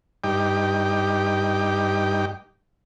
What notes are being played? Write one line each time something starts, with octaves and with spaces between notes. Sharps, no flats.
G2 D#4 G4 G5 D6